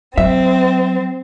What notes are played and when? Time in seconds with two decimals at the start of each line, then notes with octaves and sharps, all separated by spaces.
0.18 F#3 C4 E5